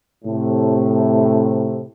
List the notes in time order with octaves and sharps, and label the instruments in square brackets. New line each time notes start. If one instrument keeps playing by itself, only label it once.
[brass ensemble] A2 C3